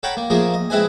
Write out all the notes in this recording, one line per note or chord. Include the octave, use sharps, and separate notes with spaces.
A4 C#5 F#5 G5 A#5 B5
A#3
F3 A3 A#3 G#4 A#4
D#5
G#3 C4 E4 B4 D#5 G#5